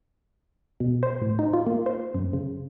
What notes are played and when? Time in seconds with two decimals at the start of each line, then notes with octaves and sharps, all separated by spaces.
0.80 B2
1.03 C5
1.22 A2
1.39 D#4
1.53 F4
1.66 A#3
1.86 C5
2.15 F#2
2.33 C#3